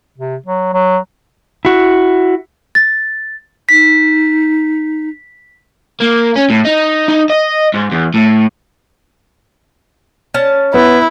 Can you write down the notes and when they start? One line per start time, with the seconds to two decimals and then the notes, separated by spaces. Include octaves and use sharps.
0.18 C3
0.46 F#3
0.74 F#3
1.65 E4 F#4
2.75 A6
3.69 D#4 B6
6.00 A#3
6.36 C#4
6.50 A2
6.65 D#4
7.08 D#4
7.30 D#5
7.74 G#2
7.91 E2
8.14 A2
10.34 C#4 A5
10.74 B3 E4